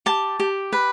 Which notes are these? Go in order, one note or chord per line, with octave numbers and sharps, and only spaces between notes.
G4 A5
G4
B4